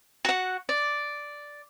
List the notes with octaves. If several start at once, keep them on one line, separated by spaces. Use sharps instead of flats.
F#4 F#5
D5